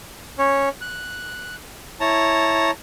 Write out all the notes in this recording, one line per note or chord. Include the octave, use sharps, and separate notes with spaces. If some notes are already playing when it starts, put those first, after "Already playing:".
C#4 C#5
F#6
E4 C#5 A5 A#5